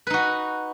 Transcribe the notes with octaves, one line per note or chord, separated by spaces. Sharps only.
D#4 F#4 B4